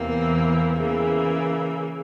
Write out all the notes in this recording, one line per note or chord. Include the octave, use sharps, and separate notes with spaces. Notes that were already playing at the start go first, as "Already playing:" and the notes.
Already playing: E2 C3 E3 A#3
C#3 E3 A#3